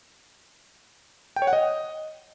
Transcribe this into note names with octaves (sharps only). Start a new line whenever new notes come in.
G5
C#5
F#5
D#5